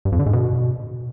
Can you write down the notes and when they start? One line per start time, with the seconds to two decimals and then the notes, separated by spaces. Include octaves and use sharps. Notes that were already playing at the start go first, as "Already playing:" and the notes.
0.05 G2
0.12 F2
0.19 D3
0.26 G#2
0.33 B2